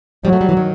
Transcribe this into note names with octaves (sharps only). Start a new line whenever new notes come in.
F#3 G3
A3
G3
E3
D#3